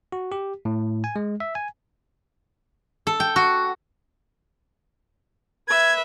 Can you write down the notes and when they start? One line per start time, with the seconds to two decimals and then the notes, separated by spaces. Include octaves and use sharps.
0.12 F#4
0.32 G4
0.65 A2
1.04 G#5
1.16 G#3
1.40 E5
1.55 G#5
3.07 A4
3.20 G5
3.36 F#4
5.68 B4 E5 G#6